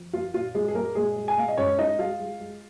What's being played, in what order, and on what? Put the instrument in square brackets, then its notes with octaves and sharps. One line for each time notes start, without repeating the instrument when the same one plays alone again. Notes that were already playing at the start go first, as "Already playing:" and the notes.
Already playing: [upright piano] F3
A#3 F4
A#2 F4
A#2 G#3 G#4
G#4
G#3 A#3 A#4
A#2 G#3 G#4
G#3
G#5
A#2 F5
D#5
G#2 C#4 C#5
G#3 D#4 D#5
G#3 F4 F5
G#3
G#3